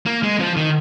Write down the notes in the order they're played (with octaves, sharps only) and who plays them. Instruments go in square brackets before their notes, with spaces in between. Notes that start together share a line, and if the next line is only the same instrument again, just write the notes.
[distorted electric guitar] A#3
G#3
F3
D#3